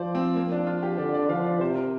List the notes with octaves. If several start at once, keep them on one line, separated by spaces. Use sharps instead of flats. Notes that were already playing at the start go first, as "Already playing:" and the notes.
Already playing: F3 C5 D5
C4
A#3
D4
F4
G4
D3 D5
D5
F3 F5
D5
C3 C5
A#4